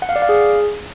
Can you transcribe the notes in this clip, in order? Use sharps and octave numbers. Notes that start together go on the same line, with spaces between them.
F#5
F5
D5
F5
G#4